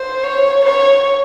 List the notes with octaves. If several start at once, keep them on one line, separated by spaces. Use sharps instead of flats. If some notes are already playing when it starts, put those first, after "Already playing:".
Already playing: C5
C#5
C#5